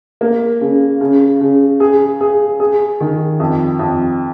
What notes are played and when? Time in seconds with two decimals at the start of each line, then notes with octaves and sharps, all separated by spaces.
0.21 A#3
0.61 C#3
1.01 C#3
1.41 C#3
1.80 G#4
2.21 G#4
2.60 G#4
3.00 D#3
3.40 F2
3.79 F2